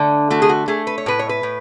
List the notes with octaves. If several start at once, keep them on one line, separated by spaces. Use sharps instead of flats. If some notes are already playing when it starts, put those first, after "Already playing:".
Already playing: D3 A3
A3 F#4
G#4
F#4
A3 G#4
B4
C#5
A2 B4
C#5
B4
A2